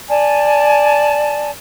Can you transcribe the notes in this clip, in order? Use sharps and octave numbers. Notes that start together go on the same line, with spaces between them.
D5 G#5 A5